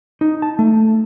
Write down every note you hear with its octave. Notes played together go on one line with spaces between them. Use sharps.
D#4
A5
A3